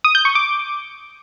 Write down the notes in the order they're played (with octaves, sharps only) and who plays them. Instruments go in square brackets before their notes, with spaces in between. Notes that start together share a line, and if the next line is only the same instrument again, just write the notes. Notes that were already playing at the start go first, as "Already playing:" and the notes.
[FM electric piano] D#6
G6
C#6
D6